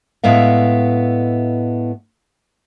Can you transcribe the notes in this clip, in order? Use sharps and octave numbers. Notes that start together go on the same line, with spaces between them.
A2 G#3 B3 E5 F5